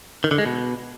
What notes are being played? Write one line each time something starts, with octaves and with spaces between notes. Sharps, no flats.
D#3
D3
G#3
B2